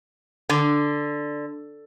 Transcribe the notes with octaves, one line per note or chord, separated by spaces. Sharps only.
D3